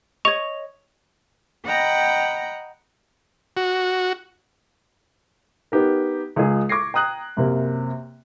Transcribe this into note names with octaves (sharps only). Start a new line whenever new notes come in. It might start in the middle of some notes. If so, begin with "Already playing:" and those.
C#5 D#5 C#6 F7
D#5 F#5 G5 A#5 B5
F#4
B3 D#4 G4 A#4
C#2 G#3 F4 G#4
C#6 D6 G#6 A#6 C7
G5 A#5 D#6 F#6 F#7
F#2 C3 A#3